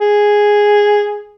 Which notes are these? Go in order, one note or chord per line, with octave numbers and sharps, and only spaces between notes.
G#4